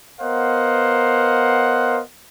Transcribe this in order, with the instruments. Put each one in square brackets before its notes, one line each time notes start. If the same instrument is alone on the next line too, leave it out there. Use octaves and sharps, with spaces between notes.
[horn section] B3 A#4 C5 D#5 F5 F#5